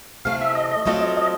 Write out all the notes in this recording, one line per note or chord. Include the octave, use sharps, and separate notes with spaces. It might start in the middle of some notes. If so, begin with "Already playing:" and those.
C3 E3 A3 F5
E5
D#5
D#5
F#3 A3 C4 F4 A4 D#5
D#5
D#5